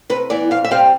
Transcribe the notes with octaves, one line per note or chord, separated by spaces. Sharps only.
C3 B4
E3 B3 D5
F2 F5
E5
C3 G3 C4 F5